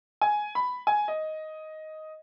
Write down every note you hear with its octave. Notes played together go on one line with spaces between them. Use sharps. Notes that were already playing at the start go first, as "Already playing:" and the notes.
G#5
B5
G#5
D#5